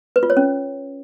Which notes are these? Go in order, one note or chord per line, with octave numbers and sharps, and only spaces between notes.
B4
F4
C#5
C#4